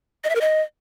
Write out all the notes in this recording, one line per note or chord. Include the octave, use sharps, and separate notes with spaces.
D#5
E5
A#4
D#5